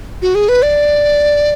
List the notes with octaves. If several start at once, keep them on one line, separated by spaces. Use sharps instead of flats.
F#4
G#4
B4
D5